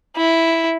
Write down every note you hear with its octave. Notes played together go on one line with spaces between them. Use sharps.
E4